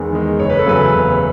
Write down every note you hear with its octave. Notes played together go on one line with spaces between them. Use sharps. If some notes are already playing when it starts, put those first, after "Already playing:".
Already playing: E2 D#3 G#3
D#3 G#3
F#1 C#5
B4
A4
E2 C#3 F#3 A3 B4
F#1